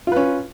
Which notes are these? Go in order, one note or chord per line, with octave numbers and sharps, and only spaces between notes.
C#4 F4 B4